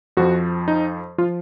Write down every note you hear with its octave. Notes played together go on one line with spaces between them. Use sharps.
F2 F3 F#4
D#4
F3 F4